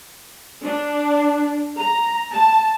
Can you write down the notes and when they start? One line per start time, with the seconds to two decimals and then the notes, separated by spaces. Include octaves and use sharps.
0.64 D4
1.78 A#5
2.34 A5